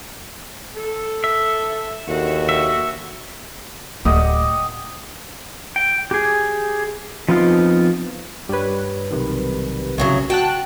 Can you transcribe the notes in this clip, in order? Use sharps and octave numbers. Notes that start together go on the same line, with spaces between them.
A4
E5
D#2 D3 F#4
E5
D1 A3 G4 D#5 F#5
G5
G4 G#4
F3 B3 C4 D#4 F4
G2 G3 B4 C#5
B1 C3 D#3
C2 A2 C#3 F#3
F#4 G5 A5 F#6